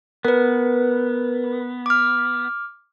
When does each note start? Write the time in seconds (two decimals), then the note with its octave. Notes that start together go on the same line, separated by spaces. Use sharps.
0.25 B3 A#4 B4
1.86 D6 F6